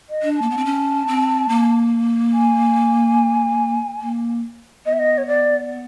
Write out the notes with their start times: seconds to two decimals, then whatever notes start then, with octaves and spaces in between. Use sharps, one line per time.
0.10 D#5
0.23 D4
0.37 A5
0.42 A#3
0.50 B3
0.57 C4
0.65 C#4
1.08 C4
1.49 A#3
2.33 G#5
4.01 A#3
4.85 B3 D#5
4.93 E5
4.99 D#5
5.18 C#5
5.27 D5